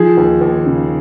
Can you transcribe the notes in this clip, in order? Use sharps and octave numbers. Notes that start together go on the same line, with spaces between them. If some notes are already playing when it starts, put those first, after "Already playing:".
Already playing: F3 G#4
D#2
D#2
C#3